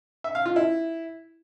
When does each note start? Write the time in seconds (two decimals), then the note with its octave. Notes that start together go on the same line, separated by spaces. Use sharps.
0.24 E5
0.35 F5
0.46 F4
0.56 E4